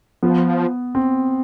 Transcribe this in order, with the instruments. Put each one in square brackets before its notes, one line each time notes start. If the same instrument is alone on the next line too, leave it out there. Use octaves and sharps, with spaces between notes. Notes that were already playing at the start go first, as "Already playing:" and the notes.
[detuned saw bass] F3 [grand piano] B3
[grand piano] C4